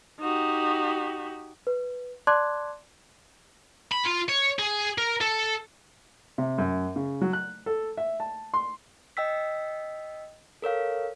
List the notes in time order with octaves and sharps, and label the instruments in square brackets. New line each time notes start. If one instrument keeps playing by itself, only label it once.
[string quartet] D#4 F#4 G4
[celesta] B4
D5 A5 C6 D6 F#6 G#6
[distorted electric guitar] B5
F4
C#5
G#4
A#4
A4
[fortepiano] C3
F#2
C#3
F#3
F#6
A4
E5
A5
C6
[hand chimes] D#5 G5 E6 B6
A4 A#4 C#5 F5